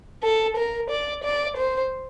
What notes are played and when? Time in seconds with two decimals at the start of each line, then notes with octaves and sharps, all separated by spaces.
0.23 A4
0.56 A#4
0.90 D5
1.24 D5
1.57 C5